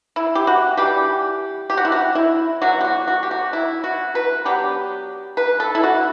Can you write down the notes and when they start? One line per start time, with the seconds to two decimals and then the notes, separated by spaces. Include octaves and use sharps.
0.16 E4
0.35 G4
0.47 F#4
0.77 E3 G3 D4 G4
1.70 G4
1.77 F#4
1.85 E4
1.92 F#4
2.15 E4
2.61 D3 F#3 B3 F#4
2.81 G4
2.84 F#4
3.07 F#4
3.23 G4
3.31 F#4
3.53 E4
3.84 F#4
4.15 B4
4.45 F#3 B3 D4 G4
5.37 B4
5.60 A4
5.75 E4
5.83 F#4